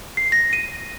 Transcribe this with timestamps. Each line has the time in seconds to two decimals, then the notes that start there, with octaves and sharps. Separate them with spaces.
0.17 C7
0.32 A#6
0.53 D#7